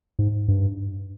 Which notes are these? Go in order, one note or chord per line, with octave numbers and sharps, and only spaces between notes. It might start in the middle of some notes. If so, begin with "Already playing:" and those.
G#2
G2